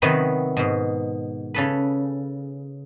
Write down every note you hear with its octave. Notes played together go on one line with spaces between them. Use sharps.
C3 D#3 F#3 B3 D#4 B4
G#2 B2
C#3 A4 B4